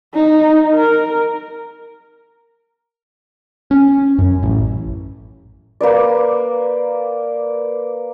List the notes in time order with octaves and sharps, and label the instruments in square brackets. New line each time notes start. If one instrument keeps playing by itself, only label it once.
[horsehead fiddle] D#4
A#4
[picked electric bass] C#4
F#2
A1
[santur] A#3 B4 D5